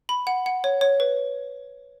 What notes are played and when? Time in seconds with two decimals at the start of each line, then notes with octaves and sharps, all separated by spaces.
0.09 B5
0.27 F#5
0.46 F#5
0.64 C#5
0.81 C#5
1.00 B4